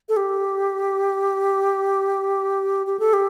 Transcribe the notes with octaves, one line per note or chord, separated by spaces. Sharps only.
A4
G4
G4
A4
G4